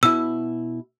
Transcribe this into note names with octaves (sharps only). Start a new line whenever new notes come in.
B2 E4 E6